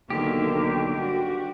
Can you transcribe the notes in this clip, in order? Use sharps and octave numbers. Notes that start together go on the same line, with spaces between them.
B1 D3 D#3 A#3 G4
G2 F#4